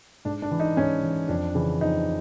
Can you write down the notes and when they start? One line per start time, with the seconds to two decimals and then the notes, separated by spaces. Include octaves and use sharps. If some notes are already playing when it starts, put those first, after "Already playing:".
0.25 G#2 D4
0.42 D4
0.51 E3
0.60 D#4
0.77 G#2 C#4
1.03 E3
1.28 F2 D4
1.55 C#3 E3
1.81 F2 D#4